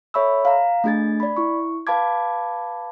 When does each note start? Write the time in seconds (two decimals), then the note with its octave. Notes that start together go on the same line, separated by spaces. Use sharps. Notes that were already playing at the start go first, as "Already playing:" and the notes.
0.14 A4 C#5 E5 B5 C#6 E6
0.45 F5 A#5
0.84 A3 D4 G#4 G#6 A6
1.20 D5 B5
1.37 E4 C#6
1.87 B4 F5 A5 B5 D6 G#6